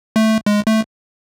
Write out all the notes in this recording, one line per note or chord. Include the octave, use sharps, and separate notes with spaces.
A3
G#3
A3